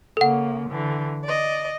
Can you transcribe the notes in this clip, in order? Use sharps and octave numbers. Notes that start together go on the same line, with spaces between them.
C#3 A#3 A4 F#5
D3 E3
D5 D#5